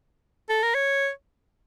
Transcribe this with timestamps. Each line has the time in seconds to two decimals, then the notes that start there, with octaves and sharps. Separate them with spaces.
0.49 A4
0.63 A#4
0.75 C#5